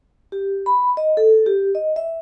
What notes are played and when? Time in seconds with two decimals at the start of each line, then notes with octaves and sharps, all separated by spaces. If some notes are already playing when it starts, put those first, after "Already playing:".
0.32 G4
0.66 B5
0.97 D#5
1.17 A4
1.46 G4
1.75 D#5
1.96 E5